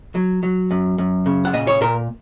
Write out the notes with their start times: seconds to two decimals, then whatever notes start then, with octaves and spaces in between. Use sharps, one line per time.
0.15 F#3
0.43 F#3
0.71 F#2
0.98 F#2
1.26 C#3
1.45 F#5
1.53 A#2 D#5
1.67 C#5
1.81 A#2 A#4